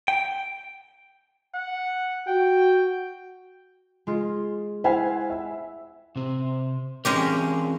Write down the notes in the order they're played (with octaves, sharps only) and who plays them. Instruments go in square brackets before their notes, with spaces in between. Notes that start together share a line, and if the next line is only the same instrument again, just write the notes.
[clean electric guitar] G5
[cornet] F#5
[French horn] F#4 [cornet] G5
[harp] G#3 F4
[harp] E4 F5 [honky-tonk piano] C5 F#5 G#5
[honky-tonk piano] E5
[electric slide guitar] C3 C4
[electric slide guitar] E3 C4 A#4 [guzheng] G#3 C#4 G4